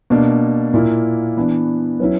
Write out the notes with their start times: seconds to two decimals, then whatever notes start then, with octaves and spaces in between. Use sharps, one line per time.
0.10 B2 A#3 D4
0.74 A#2 A#3 E4
1.37 E3 B3 D4
2.00 F#3 C#4 E4 B4